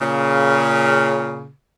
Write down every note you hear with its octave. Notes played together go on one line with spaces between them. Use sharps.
A#2 C#3